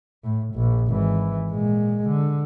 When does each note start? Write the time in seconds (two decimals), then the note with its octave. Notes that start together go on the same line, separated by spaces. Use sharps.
0.24 A2
0.54 A#1
0.88 G#1 E3
1.52 A#2 G#3
2.08 D3